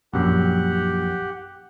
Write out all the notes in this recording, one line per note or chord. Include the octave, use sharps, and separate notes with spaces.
A#1 F#2 G4 F#5